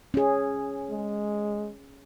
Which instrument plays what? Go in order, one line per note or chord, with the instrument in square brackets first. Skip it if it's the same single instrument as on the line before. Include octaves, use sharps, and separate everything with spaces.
[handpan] C#4 G#4
[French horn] G#3